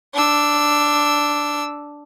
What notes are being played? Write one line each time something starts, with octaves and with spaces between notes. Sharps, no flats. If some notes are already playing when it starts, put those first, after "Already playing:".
D4 E6